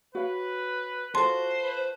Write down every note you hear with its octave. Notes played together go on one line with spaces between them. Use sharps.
F#4 B4 C#5 F5
F4 F#4 A4 C5 A5 C6
B4